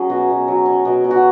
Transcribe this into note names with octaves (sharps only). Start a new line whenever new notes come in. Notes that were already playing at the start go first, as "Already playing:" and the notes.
Already playing: F#3 C#4 G#4
B2 F#4
B2
F#3
C#4
B2
B2
F#4